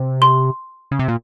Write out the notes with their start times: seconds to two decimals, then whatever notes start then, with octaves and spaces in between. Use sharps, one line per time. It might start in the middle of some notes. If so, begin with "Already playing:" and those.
Already playing: C3
0.22 C6
0.91 C#3
0.99 C3
1.08 A#2